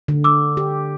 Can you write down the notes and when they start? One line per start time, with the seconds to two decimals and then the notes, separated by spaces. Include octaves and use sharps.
0.08 D3
0.24 D6 E6
0.57 G4